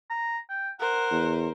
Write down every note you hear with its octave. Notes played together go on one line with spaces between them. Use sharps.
A#5
G5
A#4 C5 F#5
E2